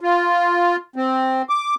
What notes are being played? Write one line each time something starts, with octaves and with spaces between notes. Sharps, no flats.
F4
C4
D6